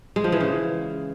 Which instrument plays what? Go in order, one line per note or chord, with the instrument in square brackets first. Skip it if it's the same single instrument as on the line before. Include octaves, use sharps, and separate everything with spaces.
[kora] G#3
F3
E3
C#3